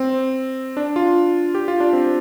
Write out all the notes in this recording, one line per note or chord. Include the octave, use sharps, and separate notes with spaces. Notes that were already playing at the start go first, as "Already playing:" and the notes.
Already playing: C4
D4
F4
G4
F4
D4
C4